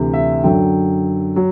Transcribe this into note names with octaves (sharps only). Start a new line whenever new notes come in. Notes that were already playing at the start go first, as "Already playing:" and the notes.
Already playing: D2 C3 E3
E5
F#2 D3 F#3 G5
F#3